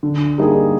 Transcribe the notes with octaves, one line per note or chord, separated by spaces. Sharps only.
D3
G3 A#3 D#4 G#4